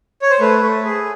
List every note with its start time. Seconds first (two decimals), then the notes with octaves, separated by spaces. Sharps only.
0.22 C#5
0.31 C5
0.40 A3 B4
0.62 A3
0.84 G#4